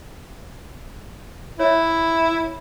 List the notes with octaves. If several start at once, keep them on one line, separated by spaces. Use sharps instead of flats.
E4 C#5 E5